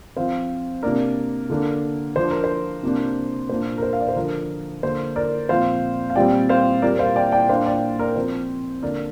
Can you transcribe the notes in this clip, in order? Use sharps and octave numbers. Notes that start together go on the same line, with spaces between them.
F3 C4 C5 F5
C3 A#3 D4 A#4 D5
D3 A#3 D4
F3 D4 C5
A#4
C5
C3 A#3 D4
A#2 A#3 D4 C5
A#4
C5
F5
D5
C5
D3 F3 D4 A#4
D3 A#3 D4 C5
A#4 D5
A#2 F3 C4 C5 F5
F5
A#2 G3 C4 D5 G5
C5 F5
A#2 G3 A#3 A#4 D5
C5 F5
D5 G5
D5 G5
A#2 A#3 D4 C5 F5
D5 G5
A#4 D5
F3 C4 C5
D3 A#3 D4 A#4 D5